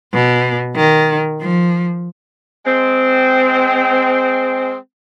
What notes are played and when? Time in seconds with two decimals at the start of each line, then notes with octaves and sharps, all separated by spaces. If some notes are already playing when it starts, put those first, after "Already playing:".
0.14 B2
0.76 D#3
1.41 F3
2.65 G#3 C4